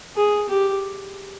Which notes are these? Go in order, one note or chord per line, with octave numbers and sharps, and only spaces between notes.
G#4
G4